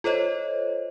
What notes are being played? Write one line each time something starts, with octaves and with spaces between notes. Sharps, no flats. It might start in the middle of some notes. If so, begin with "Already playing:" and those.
F4 A4 C5 C#5 D#5